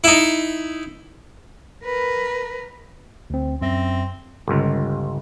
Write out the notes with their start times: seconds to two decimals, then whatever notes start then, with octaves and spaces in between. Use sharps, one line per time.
0.04 D#4 E4
1.84 A#4 B4
3.30 D2 C4
3.61 F#2 C4 E5 A#6
4.48 G1 C#2